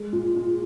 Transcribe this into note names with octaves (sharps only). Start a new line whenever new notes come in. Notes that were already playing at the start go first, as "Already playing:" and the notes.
Already playing: G#3
A#2
A#2